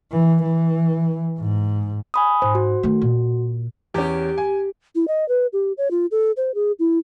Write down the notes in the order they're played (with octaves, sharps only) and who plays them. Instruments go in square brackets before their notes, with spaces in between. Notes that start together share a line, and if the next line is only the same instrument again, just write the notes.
[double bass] E3
E3
G#2
[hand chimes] G#5 B5 D#6
[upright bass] G#2 [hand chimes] C5
[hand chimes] F#4
[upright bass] D#3 A3
A#2
[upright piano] E2 C#4 [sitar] G4
[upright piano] G#5
[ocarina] E4
D#5
B4
G4
C#5
F4
A4
C5
G#4
E4